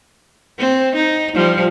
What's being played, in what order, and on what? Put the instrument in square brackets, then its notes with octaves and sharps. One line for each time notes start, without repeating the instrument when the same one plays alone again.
[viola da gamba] C4
D#4
F3 G3